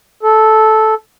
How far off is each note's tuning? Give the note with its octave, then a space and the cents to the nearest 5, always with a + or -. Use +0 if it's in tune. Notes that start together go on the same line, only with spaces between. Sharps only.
A4 -10